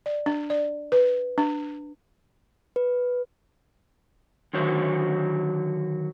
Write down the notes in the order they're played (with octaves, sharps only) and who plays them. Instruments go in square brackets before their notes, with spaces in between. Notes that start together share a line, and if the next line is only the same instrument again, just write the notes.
[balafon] D5
D4
D5
B4
D4
[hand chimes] B4
[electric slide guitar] D3 D#3 F#3 C5